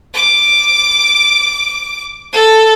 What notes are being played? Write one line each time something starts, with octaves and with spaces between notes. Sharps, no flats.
D6
A4